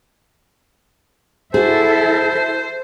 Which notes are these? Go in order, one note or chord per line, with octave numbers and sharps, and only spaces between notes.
E4 F#4 G#4 A4 C5 E5